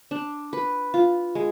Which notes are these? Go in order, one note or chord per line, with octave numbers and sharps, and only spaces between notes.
D4
B4
F4
G#3